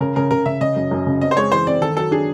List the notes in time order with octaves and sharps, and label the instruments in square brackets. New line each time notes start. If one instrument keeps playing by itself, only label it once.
[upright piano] C#3 [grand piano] A#4
[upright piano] C#3 [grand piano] A#4
[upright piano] C#3 [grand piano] A#4
[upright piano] C#3 [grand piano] E5
[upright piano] C#3 [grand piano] D#5
[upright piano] F#2
F#2
C#3
[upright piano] C4 [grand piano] D#5
[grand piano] C5
[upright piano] G#3 [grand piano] C#5
[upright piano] E3 [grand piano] C5
[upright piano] C4 [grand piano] D5
[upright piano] D#3 [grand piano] A4
[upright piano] F#3 [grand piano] A4
[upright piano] D4 [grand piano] G#4